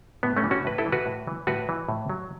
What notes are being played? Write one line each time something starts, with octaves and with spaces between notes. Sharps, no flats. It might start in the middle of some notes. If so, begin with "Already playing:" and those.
A2 B3
A3 C#4
E3
C#4 F#4
A2 B4
E4 A4
E3
F#4 B4
A2
E3
A2 F#4 B4
E3
A2
F#3